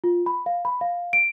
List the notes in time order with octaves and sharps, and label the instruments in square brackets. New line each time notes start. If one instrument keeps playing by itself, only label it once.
[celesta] F4
B5
F5
B5
F5
D7